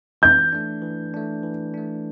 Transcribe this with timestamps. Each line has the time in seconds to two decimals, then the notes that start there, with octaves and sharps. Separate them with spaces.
0.22 E3 G6
0.53 A3 D4
0.82 E3
1.14 A3 D4
1.43 E3
1.74 A3 D4